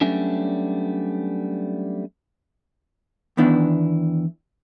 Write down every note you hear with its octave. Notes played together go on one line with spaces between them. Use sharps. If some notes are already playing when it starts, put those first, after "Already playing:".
F#3 G3 A3 B3 C#4 D4
E2 D#3 B3 D4 E4